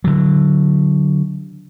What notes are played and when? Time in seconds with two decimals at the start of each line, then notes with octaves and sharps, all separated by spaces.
0.04 D3 F#3